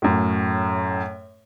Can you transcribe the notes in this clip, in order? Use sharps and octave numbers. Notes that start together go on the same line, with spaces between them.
F#2 A2